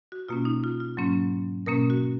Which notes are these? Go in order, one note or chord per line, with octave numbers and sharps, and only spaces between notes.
F#4
B2 A#3 C#4 F4
D#4
F4
F4
G#2 F#3 A#3 C#4
B2 A#3 C#4 A#4
F#4